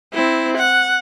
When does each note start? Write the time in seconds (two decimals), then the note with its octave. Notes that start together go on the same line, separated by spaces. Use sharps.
0.13 C4 E4
0.57 F#5